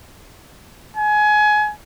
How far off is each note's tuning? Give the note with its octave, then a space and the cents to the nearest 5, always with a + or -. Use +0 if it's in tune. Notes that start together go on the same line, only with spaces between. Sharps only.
G#5 +25